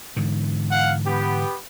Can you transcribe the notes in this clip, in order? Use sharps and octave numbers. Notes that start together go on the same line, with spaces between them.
G#2 D3 E3
F5 F#5
B3 G4